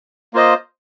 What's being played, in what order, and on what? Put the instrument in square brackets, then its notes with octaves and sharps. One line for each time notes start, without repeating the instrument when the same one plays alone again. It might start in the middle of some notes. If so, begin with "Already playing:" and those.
[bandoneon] A#3 F4 C5 D#5